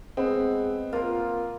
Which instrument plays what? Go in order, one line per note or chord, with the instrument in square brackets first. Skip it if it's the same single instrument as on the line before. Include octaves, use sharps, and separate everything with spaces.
[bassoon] G#3 [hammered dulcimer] B3 [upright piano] C4
[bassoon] A#3 [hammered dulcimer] F4 A#4